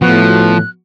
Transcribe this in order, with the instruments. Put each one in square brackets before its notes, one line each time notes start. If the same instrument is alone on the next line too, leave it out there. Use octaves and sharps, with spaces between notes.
[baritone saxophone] A2 [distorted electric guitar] F3 [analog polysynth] B3 F#4 [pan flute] F#6